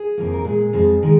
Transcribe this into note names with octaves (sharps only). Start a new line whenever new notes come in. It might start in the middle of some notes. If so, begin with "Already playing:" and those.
Already playing: G#4
F2 F3 A#3
A#4
A#2 G#3 G#4
F2 F3 G#3
D#3 G#3